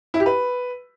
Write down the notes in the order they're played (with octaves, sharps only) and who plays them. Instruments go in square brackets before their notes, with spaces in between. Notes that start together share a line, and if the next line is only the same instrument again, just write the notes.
[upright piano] E4
G4
B4